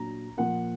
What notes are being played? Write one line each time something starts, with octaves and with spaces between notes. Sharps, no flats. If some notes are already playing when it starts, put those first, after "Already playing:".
Already playing: A#2 F#3 D4 A#5
A#2 F3 A#3 F#5